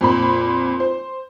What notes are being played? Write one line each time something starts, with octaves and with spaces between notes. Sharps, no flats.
F2 A#2 B5
C5